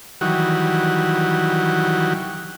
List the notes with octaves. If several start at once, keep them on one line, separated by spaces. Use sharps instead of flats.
D#3 E3 F#3 G3 F#4